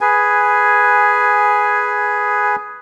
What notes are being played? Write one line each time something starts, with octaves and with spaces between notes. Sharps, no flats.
G#4 B4 G#5